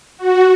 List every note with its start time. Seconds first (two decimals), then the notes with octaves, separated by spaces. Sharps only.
0.18 F#4